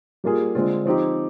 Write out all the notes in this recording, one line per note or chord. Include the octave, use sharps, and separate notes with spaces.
G3 A#3 F4 G#4
D3 G#3 C4 F4
F3 C4 D#4 G4